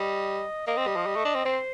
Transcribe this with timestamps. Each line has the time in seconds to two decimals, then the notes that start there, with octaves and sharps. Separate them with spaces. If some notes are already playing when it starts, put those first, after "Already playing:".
Already playing: G3 D#5
0.67 A#3 D#5
0.77 C4
0.87 G3
0.96 F3
1.06 G3
1.16 A3
1.25 D4
1.35 C4
1.45 C4 C5